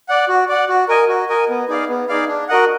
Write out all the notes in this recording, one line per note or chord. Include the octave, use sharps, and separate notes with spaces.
D5 F#5
F#4
D5 F#5
F#4
A#4 D#5 G#5
F#4
A#4 D#5 G#5
B3
D#4 G#4 D5 F5
B3
D#4 G#4 D5 F5
D4
F#4 A#4 D#5 F#5